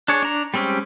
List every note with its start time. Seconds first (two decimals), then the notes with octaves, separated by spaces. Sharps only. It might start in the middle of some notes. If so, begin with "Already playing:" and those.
0.08 D4 G#4 C#5
0.23 D4 A#5
0.54 G3 G#3 C4 C#4 G4